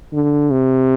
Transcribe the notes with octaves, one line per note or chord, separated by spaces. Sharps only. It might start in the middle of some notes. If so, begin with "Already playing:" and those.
D3
C3